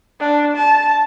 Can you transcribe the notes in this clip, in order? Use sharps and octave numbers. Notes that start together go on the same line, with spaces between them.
D4
A5